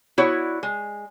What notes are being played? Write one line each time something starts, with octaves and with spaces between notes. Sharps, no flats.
B3 E4 F#4 C#5 D5
G#3